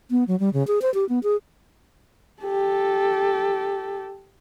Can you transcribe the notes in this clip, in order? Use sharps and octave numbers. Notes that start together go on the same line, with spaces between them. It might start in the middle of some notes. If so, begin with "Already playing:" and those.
B3
F#3
G3
C#3
G#4
C5
G4
B3
G#4
G4 A4